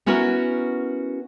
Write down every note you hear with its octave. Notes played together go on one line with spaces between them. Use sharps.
B3 C#4 E4 F#4 A#4